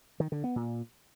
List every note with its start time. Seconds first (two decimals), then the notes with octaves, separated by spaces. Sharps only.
0.20 D#3
0.32 D3
0.44 B3
0.56 A#2